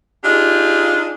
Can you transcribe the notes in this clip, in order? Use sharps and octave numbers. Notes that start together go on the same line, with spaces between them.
D4 D#4 F4 G4 G#4